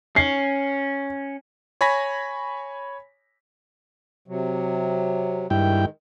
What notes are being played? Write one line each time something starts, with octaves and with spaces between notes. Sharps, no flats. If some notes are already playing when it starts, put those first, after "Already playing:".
C#4 C7
C#5 G#5 B5 A#6 B6
C3 F#3
G2 D#3 G#3 E4 G5